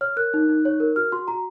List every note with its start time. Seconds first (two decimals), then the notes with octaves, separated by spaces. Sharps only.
0.01 C#5 F6
0.17 A#4 F#6
0.34 D#4
0.49 D#4
0.65 C#5
0.80 A#4
0.96 F#4 F6
1.12 F#4 C6
1.28 F#4 A#5